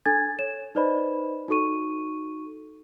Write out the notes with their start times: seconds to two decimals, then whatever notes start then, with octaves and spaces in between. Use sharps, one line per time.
0.06 D4 A4 G#5 G#6 A6
0.39 C#5 E7
0.75 D#4 B4 C5 D5 D#5 B5
1.48 D#4 F#4 A4 C#6 D#7